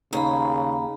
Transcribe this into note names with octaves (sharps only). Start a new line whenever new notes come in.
D#2 C#3 A#5 B5